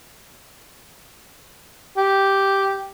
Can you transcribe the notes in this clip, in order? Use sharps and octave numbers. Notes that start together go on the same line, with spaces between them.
G4